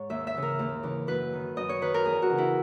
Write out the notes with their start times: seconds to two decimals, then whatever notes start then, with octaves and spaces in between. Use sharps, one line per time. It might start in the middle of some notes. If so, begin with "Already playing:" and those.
Already playing: G#2 C#5
0.10 D#2 E5
0.27 E5
0.35 C#3 E3
0.42 A#4
0.59 D#2
0.83 C#3 E3
1.07 F#2 B4
1.33 D#3
1.57 F#2 D#5
1.69 C#5
1.82 D#3 B4
1.94 A#4
2.05 E2 G#4
2.22 F#4
2.30 C#3 E3
2.38 E4